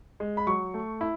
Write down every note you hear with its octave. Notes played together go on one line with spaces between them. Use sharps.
G#3
B5
F#3 C#6
A3
E4